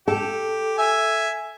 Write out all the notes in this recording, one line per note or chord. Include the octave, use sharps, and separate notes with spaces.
G4 A4
E5 G#5